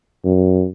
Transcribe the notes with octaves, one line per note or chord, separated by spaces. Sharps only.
F#2